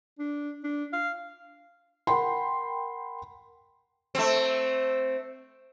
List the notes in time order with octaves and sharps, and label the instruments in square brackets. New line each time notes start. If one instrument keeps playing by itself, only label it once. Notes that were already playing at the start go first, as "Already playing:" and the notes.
[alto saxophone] D4
D4
F5
[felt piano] A#4 F#5 G5 B5 C6
[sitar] A3 C4